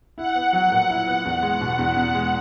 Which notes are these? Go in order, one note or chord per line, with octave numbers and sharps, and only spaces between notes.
E4 F#5
B3
F#3
A#2
E4
B3
E2 F#5
G#3
B2
E2 F#5
E2
G#3